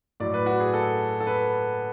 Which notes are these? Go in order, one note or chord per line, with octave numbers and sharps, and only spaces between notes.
A2 F#3 D5
B4
F#4
G#4
A4
A4
B4